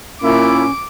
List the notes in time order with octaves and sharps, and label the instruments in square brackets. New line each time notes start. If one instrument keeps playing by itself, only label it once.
[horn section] A#2 A#3 E4 [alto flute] C#4 [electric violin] D6